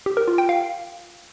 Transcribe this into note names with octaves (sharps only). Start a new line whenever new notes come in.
G4
A#4
F4
G5
F5